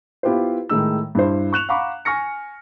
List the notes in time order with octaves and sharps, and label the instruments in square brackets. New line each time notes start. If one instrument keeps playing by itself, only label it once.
[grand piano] B3 E4 F4 G4 B4 C5
A2 D#3 G#3 D#4 E6
G2 E4 C5
C#6 F#6 E7 F7
F5 F#5 A#5 B5 C#6 D6
G#5 C#6 F6 A#6 C#7